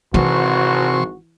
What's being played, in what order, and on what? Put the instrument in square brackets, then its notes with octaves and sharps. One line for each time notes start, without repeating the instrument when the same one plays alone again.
[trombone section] G#1 F#4 [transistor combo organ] C3 C6 C#6 [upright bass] E3